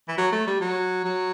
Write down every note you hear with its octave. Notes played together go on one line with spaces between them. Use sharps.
E3
F#3
A3
G3
F#3
F#3